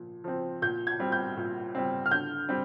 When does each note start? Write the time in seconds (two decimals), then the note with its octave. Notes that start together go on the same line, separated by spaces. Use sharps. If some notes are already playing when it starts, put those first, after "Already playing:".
Already playing: A#2 F3
0.24 F3 C4
0.62 A#2 G6
0.87 G#6
0.99 G3 C4
1.12 G6
1.37 A#2
1.75 G3 C4
2.06 F6
2.11 D3 G6
2.49 G3 C4